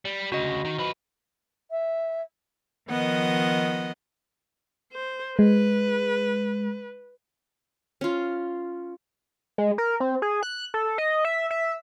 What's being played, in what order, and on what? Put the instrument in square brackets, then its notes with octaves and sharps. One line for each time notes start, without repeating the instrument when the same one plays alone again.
[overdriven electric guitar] G3
[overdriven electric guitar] D2 C#3 [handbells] F#4 D#5
[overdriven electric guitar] D#3
F3 B4
[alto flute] E5
[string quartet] D#3 F3 B3 D#5 F#5
[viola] C5
[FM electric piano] G#3 [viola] B4
[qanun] C#4 F4
[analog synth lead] G#3
A#4
C4
G#4
F#6
A4
D#5
E5
E5